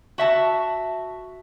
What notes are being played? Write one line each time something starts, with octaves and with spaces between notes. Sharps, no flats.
F#4 E5 A5